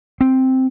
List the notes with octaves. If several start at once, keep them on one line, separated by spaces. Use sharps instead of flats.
C4